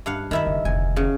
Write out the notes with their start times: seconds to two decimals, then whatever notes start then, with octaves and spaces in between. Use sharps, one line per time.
0.06 G2 F5 F#5
0.31 F#2 D#3 E4 E5
0.47 F#1
0.65 F1 D2 G#5
0.96 C#3